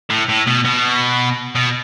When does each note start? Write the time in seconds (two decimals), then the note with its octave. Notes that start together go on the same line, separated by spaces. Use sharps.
0.10 A2
0.29 A2
0.47 B2
0.65 B2
1.55 B2